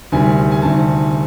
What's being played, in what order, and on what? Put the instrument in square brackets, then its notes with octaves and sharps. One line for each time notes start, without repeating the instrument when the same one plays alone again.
[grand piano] D2 C3 D#3 G3 G#5
G#5
D2 C3 D#3 G3 A5